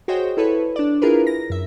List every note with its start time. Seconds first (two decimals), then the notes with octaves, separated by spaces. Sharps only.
0.08 F#4 G#4 C5 C#5 D#5 G5
0.37 E4 A4 B4 C#5
0.76 D4 D5
1.02 D4 E4 F4 G#4 A#4 B4
1.27 A#6
1.50 F#2 E5